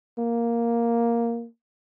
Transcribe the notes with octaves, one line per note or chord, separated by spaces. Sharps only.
A#3